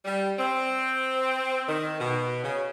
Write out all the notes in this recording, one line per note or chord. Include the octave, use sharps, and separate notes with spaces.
G3
C4
D#3
B2
C#3